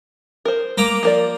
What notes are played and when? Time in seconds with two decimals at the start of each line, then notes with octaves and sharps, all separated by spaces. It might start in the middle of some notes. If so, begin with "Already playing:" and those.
0.45 A#4 C5
0.78 A#3 A#5 D6
1.03 F3 A#4 D5